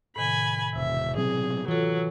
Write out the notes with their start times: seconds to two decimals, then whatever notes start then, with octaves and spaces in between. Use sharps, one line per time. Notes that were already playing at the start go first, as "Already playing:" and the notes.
0.16 A2 C3 D#3 G#5 B5
0.75 E1 C3 E5
1.17 B2 F#3 C4 G#4
1.68 E3 F#3 F4 A4